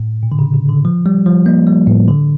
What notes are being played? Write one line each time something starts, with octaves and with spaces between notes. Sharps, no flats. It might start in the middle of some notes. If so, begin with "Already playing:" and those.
Already playing: A2
A#2
D3
C#3
C#3
D3
F3
G3
F3
A#3
G3
A2
D3